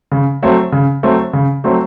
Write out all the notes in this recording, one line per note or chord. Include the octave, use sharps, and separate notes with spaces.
C#3
F#3 A3 C4
C#3
F#3 A3 C4
C#3
F#3 A3 C4